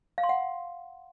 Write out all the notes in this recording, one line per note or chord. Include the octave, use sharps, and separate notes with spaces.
F5
C6
F#5